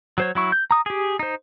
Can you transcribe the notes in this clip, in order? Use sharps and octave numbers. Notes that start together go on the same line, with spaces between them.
F#3 C5 C#5
F#3 E4 C#6
G6
A#5 D#6
G4 G#4
D#4 C5